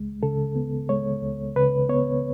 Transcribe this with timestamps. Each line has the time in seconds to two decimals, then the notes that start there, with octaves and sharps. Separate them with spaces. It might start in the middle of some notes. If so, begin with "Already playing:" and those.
Already playing: C#2 G#3
0.23 C#3 A4
0.55 B3
0.89 G#3 C#5
1.22 C#2
1.56 C#3 B4
1.89 B3 C#5